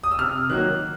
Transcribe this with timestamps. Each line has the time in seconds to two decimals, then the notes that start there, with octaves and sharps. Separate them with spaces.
0.03 D#6
0.11 E6
0.19 C3 F6
0.49 D#3 F#3 A#3 F#6